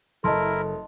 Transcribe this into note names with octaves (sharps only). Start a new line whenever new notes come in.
F#1 E4 A4 A#4 D#5 A5 C6